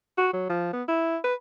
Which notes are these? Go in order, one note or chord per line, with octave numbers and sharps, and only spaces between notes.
F#4
F#3
F3
B3
E4
B4